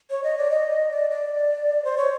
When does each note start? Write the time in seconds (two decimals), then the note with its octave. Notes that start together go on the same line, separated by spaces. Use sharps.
0.10 C#5
0.24 D#5
0.37 D5
0.51 D#5
0.90 D5
1.11 D5
1.85 C5
1.98 C#5